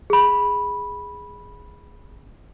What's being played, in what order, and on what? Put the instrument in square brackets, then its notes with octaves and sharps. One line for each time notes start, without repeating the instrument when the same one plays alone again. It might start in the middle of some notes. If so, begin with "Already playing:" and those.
[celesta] G#4 B5